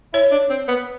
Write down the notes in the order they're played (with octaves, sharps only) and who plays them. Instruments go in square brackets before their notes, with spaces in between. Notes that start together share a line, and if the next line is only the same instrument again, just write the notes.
[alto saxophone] E4 [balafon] C#5
[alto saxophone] D4
C4
B3